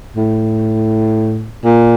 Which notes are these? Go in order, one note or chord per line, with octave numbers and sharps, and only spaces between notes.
A2
A#2